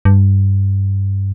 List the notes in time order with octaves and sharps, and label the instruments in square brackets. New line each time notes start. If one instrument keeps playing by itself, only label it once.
[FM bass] G2